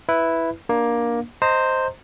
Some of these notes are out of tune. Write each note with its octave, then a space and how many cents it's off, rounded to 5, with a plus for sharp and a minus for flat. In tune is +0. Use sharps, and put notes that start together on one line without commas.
E4 +0 B4 +0
A#3 +15 D4 +5
C5 +0 D#5 +0 A#5 -30